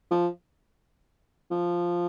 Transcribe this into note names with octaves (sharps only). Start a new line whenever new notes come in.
F3
F3